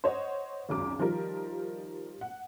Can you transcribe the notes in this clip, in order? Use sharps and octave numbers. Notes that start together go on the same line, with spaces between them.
C5 C#5 D#5 F#5
G#1 C#2 F#2 D6
D#3 F3 G3 F4 A#4
F#5